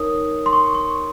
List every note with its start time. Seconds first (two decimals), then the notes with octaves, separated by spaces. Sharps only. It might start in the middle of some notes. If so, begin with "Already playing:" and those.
Already playing: D#4 A#4 C#5 D#6
0.46 C6
0.53 C#6
0.75 C#6